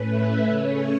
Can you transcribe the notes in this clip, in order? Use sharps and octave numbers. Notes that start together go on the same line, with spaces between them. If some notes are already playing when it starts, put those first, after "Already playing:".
Already playing: A2 A3 C#4 B4
E5
C#3 A3 C#4 C#5